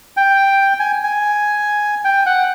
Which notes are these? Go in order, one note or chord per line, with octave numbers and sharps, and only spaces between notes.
G5
G#5
G#5
G5
F#5